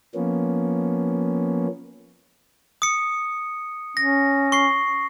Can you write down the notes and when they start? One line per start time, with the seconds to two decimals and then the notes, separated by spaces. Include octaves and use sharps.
0.15 F3 A#3 B3 C#4
2.82 D#6 C#7
3.97 C#4 A#6
4.52 C#6 C7